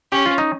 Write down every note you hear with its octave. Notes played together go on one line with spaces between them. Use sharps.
C#4 G4
F4
D#4